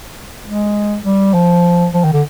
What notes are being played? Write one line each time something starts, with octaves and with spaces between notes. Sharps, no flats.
G#3
G3
F3
F3
D#3
D3